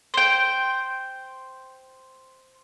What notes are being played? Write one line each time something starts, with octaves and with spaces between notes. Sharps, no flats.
C5 G5